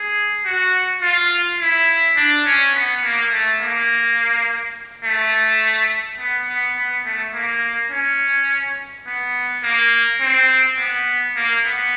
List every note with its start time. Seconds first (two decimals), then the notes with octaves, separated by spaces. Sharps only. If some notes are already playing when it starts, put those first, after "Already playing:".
Already playing: G#4
0.46 F#4
1.02 F4
1.60 E4
2.17 D4
2.46 C#4
2.75 B3
3.04 A#3
3.32 A3
3.61 A#3
5.05 A3
6.19 B3
6.48 B3
6.77 B3
7.05 A3
7.34 A#3
7.91 C#4
9.07 B3
9.64 A#3
10.21 C4
10.79 B3
11.36 A#3
11.65 B3